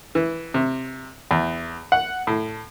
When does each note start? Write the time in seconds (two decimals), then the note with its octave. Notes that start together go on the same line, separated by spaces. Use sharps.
0.15 E3
0.54 C3
1.31 E2
1.92 F#5
2.27 A2